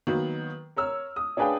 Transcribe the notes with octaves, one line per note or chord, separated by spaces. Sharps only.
D#3 F#3 A#3 B3
A#4 C#5 E6 F6
D#6
C#4 D4 G#4 B4 F5 G5